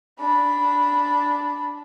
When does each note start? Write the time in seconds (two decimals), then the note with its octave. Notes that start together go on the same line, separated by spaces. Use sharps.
0.19 D4 B5